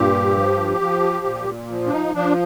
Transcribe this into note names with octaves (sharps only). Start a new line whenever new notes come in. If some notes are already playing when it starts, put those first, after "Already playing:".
Already playing: G2 A#2 G4
F3
F3
A#2
F3
D4
D#4
F3 D4